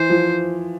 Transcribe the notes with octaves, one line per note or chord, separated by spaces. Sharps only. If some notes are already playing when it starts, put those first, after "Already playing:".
Already playing: E3 C5
F3